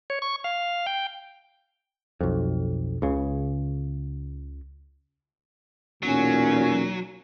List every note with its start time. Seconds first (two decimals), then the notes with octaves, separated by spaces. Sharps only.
0.10 C#5
0.22 C#6
0.44 F5
0.87 G5
2.21 B1 F2
3.02 C#2 C#3
6.03 B1 E2 A#2 F#3 C#4